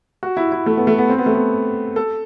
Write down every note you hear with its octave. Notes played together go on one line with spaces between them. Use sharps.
F#4
E4
E4
A3
B3
A3
B3
C4
B3
A3
B3
A4